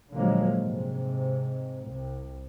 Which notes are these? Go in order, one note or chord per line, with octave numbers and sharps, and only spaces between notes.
A#2 D3 F3 F#3 G#3 A#3
G#2 C3
C2